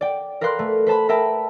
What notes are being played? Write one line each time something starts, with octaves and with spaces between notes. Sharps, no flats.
D5 G5
A#4 B4 D5 F5 C6 F#6
A3
B4 C5 A5 B5
A#4 E5 G5 A5 B5